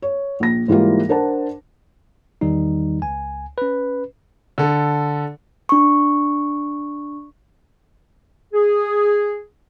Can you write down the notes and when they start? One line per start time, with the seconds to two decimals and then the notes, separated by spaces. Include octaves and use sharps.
0.02 C#5
0.40 A#1 A#6
0.68 G#2 E3 G3 A#3 F4
1.09 D4 A#4 C5 F#5 A5
2.41 E2 D#3 G3 D#4
3.02 C#2 G#5
3.58 C#4 B4
4.58 D3 A4
5.69 D4 C#6
8.54 G#4